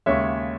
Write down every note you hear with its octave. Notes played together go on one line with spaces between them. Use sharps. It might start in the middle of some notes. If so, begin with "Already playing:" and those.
D#2 C#3 G#3 C#5 E5